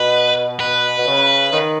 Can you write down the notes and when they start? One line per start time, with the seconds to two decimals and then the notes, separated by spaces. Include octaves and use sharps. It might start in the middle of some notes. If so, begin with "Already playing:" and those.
Already playing: B2 B4
0.60 B4
0.98 B2
1.06 C#3
1.52 D#3